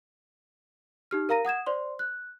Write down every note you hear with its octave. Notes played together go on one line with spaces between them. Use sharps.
D#4 G4 F6
A#4 F5 A#5 A#6 D#7
F#5 D#6 G#6 E7
C5 D5 C6
F#6